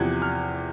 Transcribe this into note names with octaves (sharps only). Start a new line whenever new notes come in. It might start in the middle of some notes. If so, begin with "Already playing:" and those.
Already playing: E2 C3 F3 F#6 G#6
F6